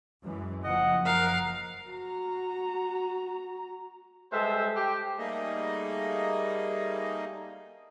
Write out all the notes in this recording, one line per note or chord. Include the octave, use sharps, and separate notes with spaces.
F#2 E3 G#3
F#1 F3 D#5 F#5
A#4 F5 F#5
F#4 A#5
G3 G#3 A4 B4 C5 E5
G4
G3 A3 A#3 D#4 G#4 D#5